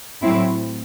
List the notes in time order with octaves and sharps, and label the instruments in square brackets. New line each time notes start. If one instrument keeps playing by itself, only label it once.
[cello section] A2 F#3 C4 E4